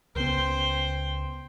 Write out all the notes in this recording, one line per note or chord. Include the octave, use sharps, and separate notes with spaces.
C#2 C#3 B3 C5 G5